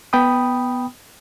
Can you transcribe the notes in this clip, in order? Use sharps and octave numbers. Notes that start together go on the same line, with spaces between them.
B3 G5 B5 D#6